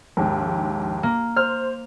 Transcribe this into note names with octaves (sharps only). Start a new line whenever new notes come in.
A#1 D#2 G#2
A#3
C5 F6